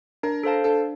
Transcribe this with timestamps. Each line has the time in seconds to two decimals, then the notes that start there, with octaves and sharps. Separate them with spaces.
0.23 D4 A#4
0.43 A4 C5 F5 A5
0.64 D4 A4